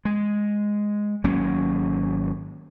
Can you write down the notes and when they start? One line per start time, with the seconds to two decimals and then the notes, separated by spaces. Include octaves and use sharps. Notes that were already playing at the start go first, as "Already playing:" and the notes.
0.05 G#3
1.24 G#1 F#3 A#3 C#4